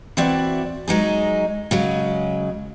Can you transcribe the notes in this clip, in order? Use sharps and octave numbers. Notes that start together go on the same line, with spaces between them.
E3 C4 E4 F#4 D5 F#5
F#3 G#3 D#4 G#4
C#3 F#3 G#3